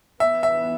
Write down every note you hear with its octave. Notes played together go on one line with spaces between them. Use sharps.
E3 B3 E5
E5